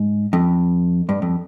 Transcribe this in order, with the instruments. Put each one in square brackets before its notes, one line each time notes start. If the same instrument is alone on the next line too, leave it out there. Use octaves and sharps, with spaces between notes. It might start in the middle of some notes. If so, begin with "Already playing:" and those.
Already playing: [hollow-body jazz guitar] G#2
F2
G2
F2